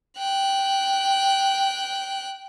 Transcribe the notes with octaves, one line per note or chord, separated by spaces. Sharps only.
G5 F#6